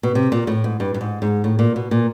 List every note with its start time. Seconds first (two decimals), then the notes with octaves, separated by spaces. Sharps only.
0.03 B2
0.15 C3
0.32 A#2
0.47 A2
0.64 G#2
0.80 G2
0.94 G2
1.01 G#2
1.22 G#2
1.44 A2
1.59 A#2
1.76 B2
1.91 A#2